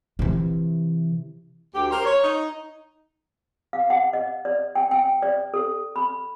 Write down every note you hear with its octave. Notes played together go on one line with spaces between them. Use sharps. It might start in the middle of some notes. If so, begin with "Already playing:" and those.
C3 E3
D2 G4
G4 A#4 C5
C#5
D#4
F5
F#5
D#5
D5
G5
G5
D5
A4
B5